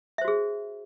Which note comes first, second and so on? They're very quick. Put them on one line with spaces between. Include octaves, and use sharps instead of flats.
E5 C5 F#4 G#4